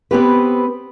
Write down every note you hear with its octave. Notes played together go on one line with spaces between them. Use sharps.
B3 C4 G4 B4